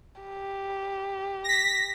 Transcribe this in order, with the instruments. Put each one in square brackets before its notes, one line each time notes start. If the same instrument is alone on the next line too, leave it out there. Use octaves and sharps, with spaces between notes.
[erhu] G4
[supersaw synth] A#6 B6